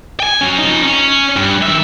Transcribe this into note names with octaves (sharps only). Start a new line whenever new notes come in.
G5 G#5
F#3 C#4
F2 D#4
C#4
G2
D#3 E5